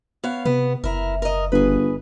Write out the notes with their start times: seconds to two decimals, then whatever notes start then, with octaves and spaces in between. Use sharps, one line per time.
0.24 B3 C#5 F5
0.45 C3 B3
0.84 F#1 E4 A#4
1.22 A#4 D#5
1.52 G1 G#4 B4